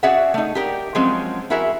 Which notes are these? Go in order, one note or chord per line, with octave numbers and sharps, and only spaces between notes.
C#4 F#4 G#4 D5 E5 F#5
A3 D#4
G4 A#4 D5
F3 F#3 G#3 C4 C#4
E4 F#4 G#4 A#4 E5